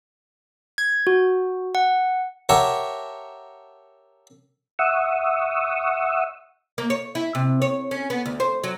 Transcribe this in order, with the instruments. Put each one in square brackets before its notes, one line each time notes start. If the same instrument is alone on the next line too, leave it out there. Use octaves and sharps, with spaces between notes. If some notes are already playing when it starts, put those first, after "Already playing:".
[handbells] G#6
F#4
F#5
[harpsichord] G4 A#4 C#5 E5 F#5 A5
[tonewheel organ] E5 F#5 C#6 D#6 E6
[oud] A#3
C#5
E4
C3
C#5
C#4
B3
D2
C5
F#3